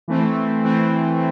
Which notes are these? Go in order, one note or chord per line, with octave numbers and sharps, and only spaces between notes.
E3 A3 C4
E3 A3 C4